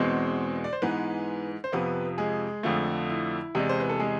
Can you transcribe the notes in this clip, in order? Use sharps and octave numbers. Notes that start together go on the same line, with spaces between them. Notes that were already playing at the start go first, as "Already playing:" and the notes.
Already playing: E2 B2 G#3 C4 C5
D5
C5
G#2 E3 G#3 B3 B4
C5
F2 C3 F3 B3 B4
G#3 G#4
F2 D3 F3 A3
E4
E2 C3 G#3 D5
C5
B4
A4
G#3 G#4